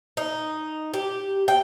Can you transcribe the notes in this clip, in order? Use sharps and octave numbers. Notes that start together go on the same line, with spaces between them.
D#4
G4
G5